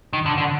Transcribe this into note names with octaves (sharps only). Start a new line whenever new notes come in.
D#3
D3
D3